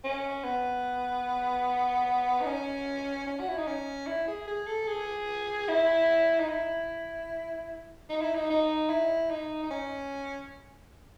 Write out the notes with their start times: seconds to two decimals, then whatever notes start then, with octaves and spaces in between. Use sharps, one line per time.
0.04 C#4
0.44 B3
2.41 D#4
2.46 C#4
3.27 C#4
3.40 F#4
3.49 E4
3.58 D#4
3.67 C#4
4.07 E4
4.28 G#4
4.47 G#4
4.67 A4
4.87 G#4
5.68 E4
6.40 D#4
6.48 E4
8.10 D#4
8.21 E4
8.35 D#4
8.50 D#4
8.89 E4
9.31 D#4
9.63 D#4
9.71 C#4